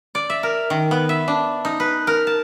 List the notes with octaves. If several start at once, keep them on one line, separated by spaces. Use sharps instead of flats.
D5
E5
A#4
D#3
B3
E5
D4
D#4
B4
A#4
A5